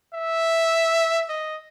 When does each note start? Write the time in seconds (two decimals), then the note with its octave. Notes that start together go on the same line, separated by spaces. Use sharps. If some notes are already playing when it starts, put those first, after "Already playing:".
0.14 E5
1.29 D#5